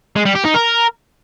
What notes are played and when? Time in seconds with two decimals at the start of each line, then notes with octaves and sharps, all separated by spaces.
0.16 G#3
0.26 G3
0.35 G4
0.45 D#4
0.54 A#4